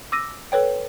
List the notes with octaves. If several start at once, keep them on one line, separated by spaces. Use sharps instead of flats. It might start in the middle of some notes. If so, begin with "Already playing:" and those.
D6 E6 A#6 D#7
A4 B4 C#5 G5